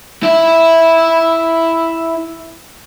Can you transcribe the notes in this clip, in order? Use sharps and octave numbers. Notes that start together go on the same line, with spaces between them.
E4 E5